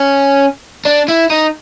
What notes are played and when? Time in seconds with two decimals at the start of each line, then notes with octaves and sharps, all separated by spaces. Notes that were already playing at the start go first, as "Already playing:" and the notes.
Already playing: C#4
0.85 D4
1.08 E4
1.30 D#4